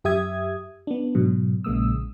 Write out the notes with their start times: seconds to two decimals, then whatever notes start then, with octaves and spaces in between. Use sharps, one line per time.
0.04 F#2 G4 E5 D#6 G#6
0.87 B3 D4
1.15 G#2 B2 F#3
1.64 A#1 C#3 G#3 A#3 D#6 E6